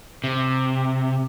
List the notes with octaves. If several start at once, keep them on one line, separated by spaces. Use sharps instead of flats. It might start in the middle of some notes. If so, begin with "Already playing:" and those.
C3